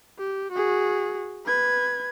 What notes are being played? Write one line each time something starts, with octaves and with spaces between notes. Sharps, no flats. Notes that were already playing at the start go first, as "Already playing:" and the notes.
G4
F#4 G#4
B4 G#6